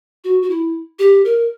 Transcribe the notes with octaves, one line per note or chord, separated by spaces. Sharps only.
F#4
F#4
E4
G4
A#4